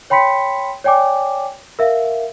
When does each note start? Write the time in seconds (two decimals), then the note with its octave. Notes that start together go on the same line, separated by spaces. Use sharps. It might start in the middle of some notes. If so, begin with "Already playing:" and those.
0.10 C#5 G5 B5 C6 B6 C#7
0.84 C#5 D5 G5 G#5 D6
1.79 A#4 E5 F5